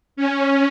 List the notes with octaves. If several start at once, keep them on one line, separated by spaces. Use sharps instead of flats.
C#4